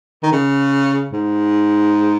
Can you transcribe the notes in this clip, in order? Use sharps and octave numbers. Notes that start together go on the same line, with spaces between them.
D#3
C#3
G#2